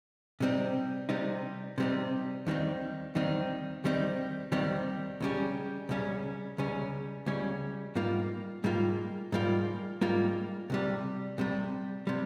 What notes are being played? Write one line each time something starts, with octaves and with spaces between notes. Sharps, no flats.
C3 G3 C4 D#4
C3 G3 C4 D#4
C3 G3 C4 D#4
D#2 D#3 G3 C4 D#4
D#2 D#3 G3 C4 D#4
D#2 D#3 G3 C4 D#4
D#2 D#3 G3 C4 D#4
C#2 C#3 G3 C#4
C#2 C#3 G3 C#4
C#2 C#3 G3 C#4
C#2 C#3 G3 C#4
G#2 G3 A#3 F4
G#2 G3 A#3 F4
G#2 G3 A#3 F4
G#2 G3 A#3 F4
C2 C3 G3
C2 C3 G3
C3 G3